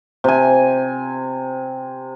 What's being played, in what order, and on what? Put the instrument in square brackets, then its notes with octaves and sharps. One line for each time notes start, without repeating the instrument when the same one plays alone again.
[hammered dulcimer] C3 G#5